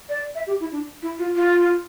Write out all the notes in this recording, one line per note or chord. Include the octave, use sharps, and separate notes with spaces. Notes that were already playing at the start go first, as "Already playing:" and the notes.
D5
E5
G4
E4
D4
E4
F4
F4